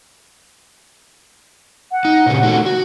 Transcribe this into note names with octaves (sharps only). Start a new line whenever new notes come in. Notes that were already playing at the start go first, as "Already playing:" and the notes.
F#5
D#4
A#2 C#3
A3 D#4 F#4
F#4